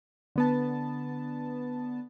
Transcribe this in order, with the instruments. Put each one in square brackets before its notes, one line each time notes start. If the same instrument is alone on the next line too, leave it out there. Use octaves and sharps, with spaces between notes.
[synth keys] D3 B3 A5